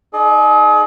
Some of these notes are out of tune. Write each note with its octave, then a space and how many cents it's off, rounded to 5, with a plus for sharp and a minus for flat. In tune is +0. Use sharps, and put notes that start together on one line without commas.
D#4 +0 G#4 +40 D#5 -45